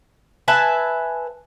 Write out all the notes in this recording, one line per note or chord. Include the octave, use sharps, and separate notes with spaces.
B4 E5 G#5 A5